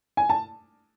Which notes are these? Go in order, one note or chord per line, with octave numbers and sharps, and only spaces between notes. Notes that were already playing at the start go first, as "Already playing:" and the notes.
G#5
A5